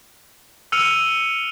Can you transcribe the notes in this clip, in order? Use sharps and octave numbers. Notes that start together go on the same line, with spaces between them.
E6 F6 C#7 D#7 F7